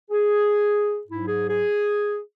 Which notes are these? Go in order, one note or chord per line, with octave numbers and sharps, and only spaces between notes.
G#4
G#2 F#3 E4
G#4
G#4